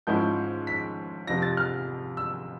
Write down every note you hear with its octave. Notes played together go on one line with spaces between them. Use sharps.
G#2 F3 G#3 C#4 E4 G6
B6
F2 C3 F3 A#6
A6
F6
E6